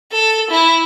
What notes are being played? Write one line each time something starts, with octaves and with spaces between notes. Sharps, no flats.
A4
E4